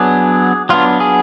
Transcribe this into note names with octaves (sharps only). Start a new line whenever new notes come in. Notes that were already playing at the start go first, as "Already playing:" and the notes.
Already playing: F#3 B3 D4 G#4
F#3 B3 D4 F4
G#4